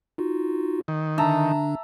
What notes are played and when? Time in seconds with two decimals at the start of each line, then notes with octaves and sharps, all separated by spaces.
0.18 D#4 F4 F#4
0.88 D#3
1.18 D3 D4 E5 A5 A#5